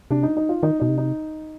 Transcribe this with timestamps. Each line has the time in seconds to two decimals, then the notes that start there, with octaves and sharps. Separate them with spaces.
0.11 C3 D4
0.23 D#4
0.37 D#4
0.49 F4
0.63 D#3 D#4
0.80 B2 D#4
0.89 C3
0.98 D#4